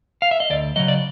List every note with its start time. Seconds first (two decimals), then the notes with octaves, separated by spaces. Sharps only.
0.22 F5
0.31 E5
0.40 D#5
0.50 D2 D5
0.76 C#3 F#3 D#5
0.88 D5